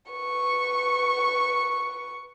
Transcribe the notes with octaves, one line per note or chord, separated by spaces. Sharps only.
B4 C#6